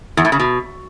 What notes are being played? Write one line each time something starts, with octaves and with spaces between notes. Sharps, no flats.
E2
A2
C#3
B2